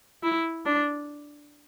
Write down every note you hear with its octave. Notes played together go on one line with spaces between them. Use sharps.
E4
D4